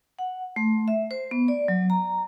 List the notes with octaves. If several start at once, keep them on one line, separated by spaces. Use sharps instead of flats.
F#5
A3
E5
C5
B3
D5
F#3
A#5